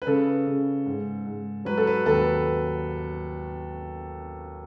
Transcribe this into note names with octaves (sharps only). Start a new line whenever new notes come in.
B4
C#3 A4
C#3
G#2
G#2
F#3 B4
A4
B4
D#2 A4
B4